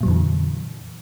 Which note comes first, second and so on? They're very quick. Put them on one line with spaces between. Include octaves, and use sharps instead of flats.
A#2 F#3 F2 E3 D3